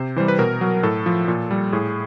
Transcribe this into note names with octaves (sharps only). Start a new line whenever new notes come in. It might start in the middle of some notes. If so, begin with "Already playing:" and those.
Already playing: C3 C5
E3 G3 C5
B4
B2 A#4
F#3
A2 A4
F3
A#2
G3
A2 G#4